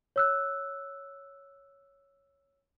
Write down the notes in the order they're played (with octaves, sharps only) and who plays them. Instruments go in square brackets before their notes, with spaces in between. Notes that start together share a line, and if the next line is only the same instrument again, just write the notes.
[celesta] C#5 E6 F#6